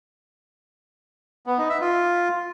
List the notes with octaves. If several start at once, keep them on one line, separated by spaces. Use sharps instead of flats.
B3
D#4
E5
F4